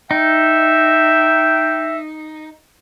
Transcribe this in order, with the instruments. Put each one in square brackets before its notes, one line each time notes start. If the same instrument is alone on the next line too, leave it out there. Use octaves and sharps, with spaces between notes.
[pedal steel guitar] D#4 [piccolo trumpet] E5 [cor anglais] G5